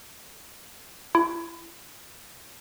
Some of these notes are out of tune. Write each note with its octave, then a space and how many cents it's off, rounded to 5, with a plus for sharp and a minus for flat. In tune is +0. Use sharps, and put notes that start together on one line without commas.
E4 +35